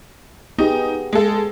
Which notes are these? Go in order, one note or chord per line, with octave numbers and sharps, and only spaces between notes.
B3 D#4 G4 G#4
G#3 A4